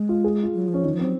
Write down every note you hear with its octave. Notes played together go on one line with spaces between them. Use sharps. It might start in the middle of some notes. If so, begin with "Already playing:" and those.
Already playing: G#3
F4
G#4
F4
F#3
F3
C#4
D#3 D#4
F3
F#3 C4